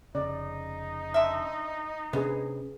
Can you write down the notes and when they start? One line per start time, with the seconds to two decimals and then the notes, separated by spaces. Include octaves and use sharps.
0.15 F1 C#3 D#4 D5
1.14 D3 E5
2.13 C3 B3 C#4 D4 G#4 B4